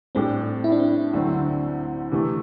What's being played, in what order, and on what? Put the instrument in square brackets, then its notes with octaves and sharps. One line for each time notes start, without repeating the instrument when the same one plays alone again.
[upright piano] A2 G3 D4 G4 [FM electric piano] C4
[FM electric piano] E4
D4
C4
D4
[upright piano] D2 D3 F#3 A3 C4
C3 E3 A3